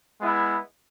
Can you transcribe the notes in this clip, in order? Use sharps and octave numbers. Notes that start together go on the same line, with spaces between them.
G#3 B3 E4